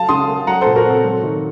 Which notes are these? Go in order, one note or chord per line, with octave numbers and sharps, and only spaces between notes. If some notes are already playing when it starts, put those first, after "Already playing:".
Already playing: F#3 F5 A5
C#3 C6 D#6
A#3
F#3 F#5 A#5
A#2 A4 C5
F#4 A#4
C4 A4
F#3
D#3